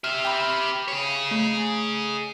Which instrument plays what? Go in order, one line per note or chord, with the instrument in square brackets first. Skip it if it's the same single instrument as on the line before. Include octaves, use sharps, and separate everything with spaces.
[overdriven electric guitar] G4 E5 [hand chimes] F6
[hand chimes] G5 B5
[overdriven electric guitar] G#4 C#5
[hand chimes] A3